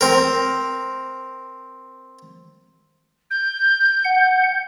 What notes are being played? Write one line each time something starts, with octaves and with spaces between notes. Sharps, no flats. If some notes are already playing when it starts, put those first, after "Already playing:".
C4 A#4
G6
F#5